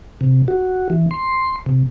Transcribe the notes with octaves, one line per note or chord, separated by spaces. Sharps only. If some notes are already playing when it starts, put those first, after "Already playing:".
C3
F#4
E3
C6
C3